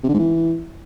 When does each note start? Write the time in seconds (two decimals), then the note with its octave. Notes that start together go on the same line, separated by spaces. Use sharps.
0.04 C3
0.09 D3
0.14 G#2
0.19 E3